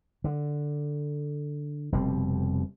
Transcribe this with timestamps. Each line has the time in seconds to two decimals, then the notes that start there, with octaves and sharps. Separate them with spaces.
0.24 D3
1.92 F1 B2 G3 C4